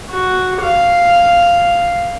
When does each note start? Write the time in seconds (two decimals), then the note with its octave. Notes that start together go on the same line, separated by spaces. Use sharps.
0.10 F#4
0.63 F5